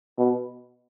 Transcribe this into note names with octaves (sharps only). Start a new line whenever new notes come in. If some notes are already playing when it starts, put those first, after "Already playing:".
B2